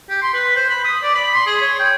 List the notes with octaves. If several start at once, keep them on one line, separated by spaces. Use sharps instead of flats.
G4
C6
B4
C5
B5
D#6
D5
B5
C6
G#4
C#5
G5